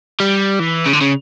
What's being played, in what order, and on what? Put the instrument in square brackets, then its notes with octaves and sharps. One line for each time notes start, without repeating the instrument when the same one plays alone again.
[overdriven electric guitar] G3
E3
C#3
D3
C#3